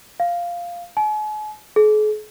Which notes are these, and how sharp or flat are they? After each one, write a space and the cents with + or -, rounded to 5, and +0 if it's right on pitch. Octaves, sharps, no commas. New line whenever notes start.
F5 -5
G#5 +45
G#4 +45